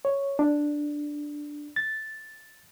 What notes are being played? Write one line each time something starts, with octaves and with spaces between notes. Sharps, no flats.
C#5
D4
A6